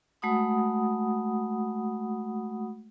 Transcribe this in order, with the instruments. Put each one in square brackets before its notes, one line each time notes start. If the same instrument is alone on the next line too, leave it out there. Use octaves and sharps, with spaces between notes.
[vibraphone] G#3 A3 F#4 F#5 B5 D#6